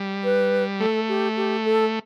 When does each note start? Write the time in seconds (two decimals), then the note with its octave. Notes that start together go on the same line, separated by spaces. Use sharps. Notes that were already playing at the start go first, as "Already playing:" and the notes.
Already playing: G3
0.24 B4
0.80 A3 A4
1.08 G4
1.37 G4
1.65 A4